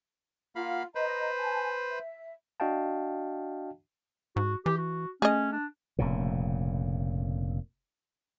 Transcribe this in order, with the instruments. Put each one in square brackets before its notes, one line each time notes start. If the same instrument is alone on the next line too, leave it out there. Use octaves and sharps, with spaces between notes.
[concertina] A#3 F5 B5 [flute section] F4 F#5
[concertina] B4 C5 [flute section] D#5 A#5
[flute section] G#5 A5
E5
[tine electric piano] D4 F#4 D#5 F5 G5 A5
[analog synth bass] G#2 [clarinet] F#4
[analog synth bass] E3 [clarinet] G4
[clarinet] F#4
[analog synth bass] A3 [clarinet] C#4 [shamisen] G#4 D#5
[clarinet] D4
[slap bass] F1 A#2 C#3